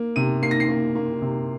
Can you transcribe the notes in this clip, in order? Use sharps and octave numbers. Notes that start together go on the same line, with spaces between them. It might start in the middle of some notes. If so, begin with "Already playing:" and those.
Already playing: A#3
C3 D#7
A#3 C7
A#6
C7
A#3
A#3
C3